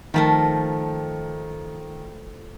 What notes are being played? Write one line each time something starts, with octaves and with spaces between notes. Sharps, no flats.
D#3 F3 A3 A#4